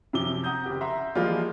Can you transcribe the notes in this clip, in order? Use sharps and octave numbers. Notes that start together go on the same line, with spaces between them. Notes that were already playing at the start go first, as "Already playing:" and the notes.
F#2 C3 F3 D6 G7
F#5 A#5 D#6 G6
F#1 G4
E5 F#5 A#5 C6
E3 F3 G3 G#3 A#3 F4